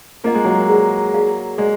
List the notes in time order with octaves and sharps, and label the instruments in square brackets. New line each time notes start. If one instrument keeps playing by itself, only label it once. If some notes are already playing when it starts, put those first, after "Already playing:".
[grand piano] A#3 [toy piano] F4 A#4 D#5 F#5
[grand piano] G#3
F#3 A#3
[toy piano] G#4 B4 D5 F#5
D#4 G#4 D5 F5
[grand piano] G#3 [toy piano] G#4 D5 F#5